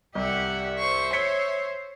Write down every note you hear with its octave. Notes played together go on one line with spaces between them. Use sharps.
C2 G4 E5 F#5
C5 C#6
C#5 B6 C#7 G7